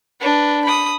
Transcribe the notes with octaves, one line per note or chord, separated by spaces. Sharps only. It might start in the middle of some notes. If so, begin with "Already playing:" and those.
D4 B4
B5 D#6